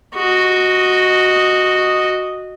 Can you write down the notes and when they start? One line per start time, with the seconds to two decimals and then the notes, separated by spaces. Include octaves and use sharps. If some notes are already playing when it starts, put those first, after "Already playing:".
0.15 F#4 D#5